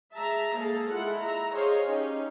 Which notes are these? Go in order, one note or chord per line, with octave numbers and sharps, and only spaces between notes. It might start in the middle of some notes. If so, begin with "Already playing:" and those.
G#3 E5 A5 A#5
G#3 A#3 G#4 A4
G#3 E4 F4 A4 F#5
E5 A#5
G#4 C5 C#5 D#5 F5
C#4 D#4 G4